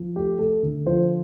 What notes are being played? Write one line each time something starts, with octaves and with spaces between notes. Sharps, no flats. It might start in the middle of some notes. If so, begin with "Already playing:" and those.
Already playing: F3
A3 G4
A3 A4
D3
F3 C5